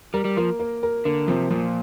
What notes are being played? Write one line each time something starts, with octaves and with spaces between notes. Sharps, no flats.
G3 A#4
G3
F3 A#3
A#3
A#4
D3 A#3
C3 F3
A#2 F3